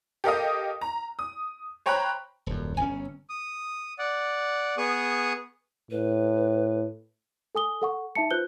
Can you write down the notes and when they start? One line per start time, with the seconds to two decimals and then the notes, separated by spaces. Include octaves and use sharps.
0.24 G4 A4 A#4 D#5 F5 D#6
0.81 A#5
1.19 D#6
1.86 C5 C#5 G5 A#5 B5 F#6
2.46 D#1 F#2
2.77 G1 C#4 G#5
3.29 D#6
3.99 D5 F#5
4.77 B3 G#4 C#6 D#6
5.91 A2 B4
7.55 A4 G#5 D#6 G7
7.82 A4 F#5 C#6
8.15 D#4 E5 A5 C#7
8.31 F4 B4 C5 F#6 G6 G7